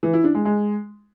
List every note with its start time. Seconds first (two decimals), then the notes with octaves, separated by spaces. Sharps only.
0.03 E3
0.13 E4
0.24 D4
0.35 G#3
0.45 G#3